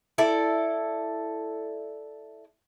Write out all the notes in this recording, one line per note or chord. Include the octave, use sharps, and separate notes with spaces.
E4 A4 D5